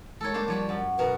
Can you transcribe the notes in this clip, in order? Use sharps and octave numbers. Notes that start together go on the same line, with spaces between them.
G#3 A4 A#4 C#5
A#3 D4 C5
F3 G3 C#5 B5
F#2
B2 A#4 B4